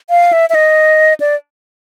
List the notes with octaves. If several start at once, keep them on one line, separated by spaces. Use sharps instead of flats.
F5
E5
E5
D#5
D5